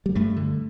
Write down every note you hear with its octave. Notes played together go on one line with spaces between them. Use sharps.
G3
G2 A3
D3